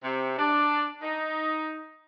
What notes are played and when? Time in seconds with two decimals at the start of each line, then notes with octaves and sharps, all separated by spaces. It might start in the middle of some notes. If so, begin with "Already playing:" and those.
0.03 C3
0.38 D4
1.01 D#4